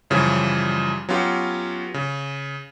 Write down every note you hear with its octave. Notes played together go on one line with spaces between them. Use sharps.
F#2 C#3 E3 F3 G3
F#3 B3 C#4 F4 G4
C#3